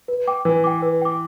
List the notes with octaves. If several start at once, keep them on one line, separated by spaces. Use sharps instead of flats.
B4
G5 D6
E3 B4
G5 D6
B4
G5 D6